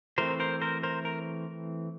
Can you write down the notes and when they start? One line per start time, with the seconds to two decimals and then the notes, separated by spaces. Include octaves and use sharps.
0.18 E3 A3 C4 A#4 C5
0.40 A#4 C5
0.62 A#4 C5
0.83 A#4 C5
1.05 A#4